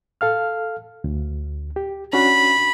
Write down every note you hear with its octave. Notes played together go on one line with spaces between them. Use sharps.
A4 F5 F6
D2
G4
C#4 D4 F#4 B5